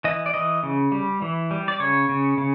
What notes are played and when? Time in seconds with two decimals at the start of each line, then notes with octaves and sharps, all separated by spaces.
0.04 E3 D#5
0.26 D5
0.34 E3 D#5
0.63 C#3
0.92 G3
1.22 E3
1.51 G3
1.68 D5
1.80 C#3 C#5
2.09 C#3
2.38 C#3